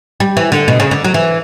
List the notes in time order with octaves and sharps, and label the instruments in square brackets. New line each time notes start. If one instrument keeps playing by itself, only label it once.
[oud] G3
E3
D3
B2
C#3
D3
F#3
E3